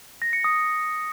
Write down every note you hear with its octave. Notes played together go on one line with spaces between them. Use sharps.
A#6
C#7
D#6